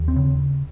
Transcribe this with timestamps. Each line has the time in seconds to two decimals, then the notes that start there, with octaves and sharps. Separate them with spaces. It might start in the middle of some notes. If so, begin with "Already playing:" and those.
Already playing: D#2
0.08 C4
0.16 C#3